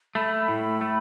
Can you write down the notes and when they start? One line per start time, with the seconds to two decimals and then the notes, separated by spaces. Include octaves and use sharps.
0.15 A3 B5
0.48 A2
0.81 A3